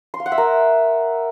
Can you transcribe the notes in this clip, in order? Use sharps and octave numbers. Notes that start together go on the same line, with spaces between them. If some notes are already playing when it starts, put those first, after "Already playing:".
C6
F5
F#5
E5
A#4